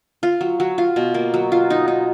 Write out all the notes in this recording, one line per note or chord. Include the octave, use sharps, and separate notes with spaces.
F4
F#3
F#3
F4
B2
A#3
F#3
F4
D#4
D#4